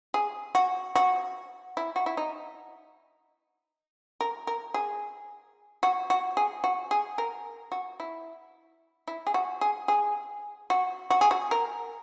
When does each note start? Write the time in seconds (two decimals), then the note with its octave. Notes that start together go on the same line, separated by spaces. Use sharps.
0.14 G#4
0.55 F#4
0.95 F#4
1.77 E4
1.96 F#4
2.06 E4
2.17 D#4
4.21 A#4
4.47 A#4
4.74 G#4
5.83 F#4
6.10 F#4
6.37 G#4
6.64 F#4
6.91 G#4
7.18 A#4
7.72 F#4
8.00 E4
9.08 E4
9.27 G#4
9.34 F#4
9.61 G#4
9.88 G#4
10.70 F#4
11.10 F#4
11.21 G#4
11.31 F#4
11.51 A#4